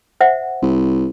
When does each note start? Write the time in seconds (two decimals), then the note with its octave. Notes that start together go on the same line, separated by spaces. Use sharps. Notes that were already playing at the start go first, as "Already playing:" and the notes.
0.21 C5 E5 F#5
0.62 C2